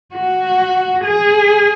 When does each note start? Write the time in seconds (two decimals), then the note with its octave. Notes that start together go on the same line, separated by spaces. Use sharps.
0.14 F#4
1.04 G#4